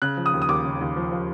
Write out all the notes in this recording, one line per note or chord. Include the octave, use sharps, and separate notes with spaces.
C#3 F#6
F3
D#6
D#2
D#6
D#2 D6
C#3
D#2
F3
F3